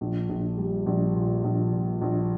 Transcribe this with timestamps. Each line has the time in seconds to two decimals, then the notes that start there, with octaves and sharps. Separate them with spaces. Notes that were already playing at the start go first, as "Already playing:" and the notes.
0.01 A#1
0.29 A#1
0.58 G3
0.86 A#1
1.14 A#2
1.44 A#1
1.72 A#2
2.01 A#1